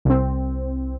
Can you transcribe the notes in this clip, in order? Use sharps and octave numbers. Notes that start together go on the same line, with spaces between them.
C2 C4